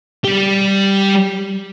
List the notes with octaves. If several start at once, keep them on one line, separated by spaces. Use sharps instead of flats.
G3 G4